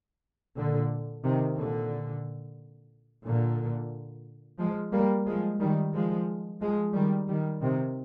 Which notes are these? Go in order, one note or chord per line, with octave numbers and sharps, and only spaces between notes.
A#2 D3
C3 D#3
A#2 D3
A#2 D3
F3 G#3
G3 A#3
F3 G#3
D#3 G3
F3 G#3
F3 G#3
D#3 G3
D#3 G3
C3 D#3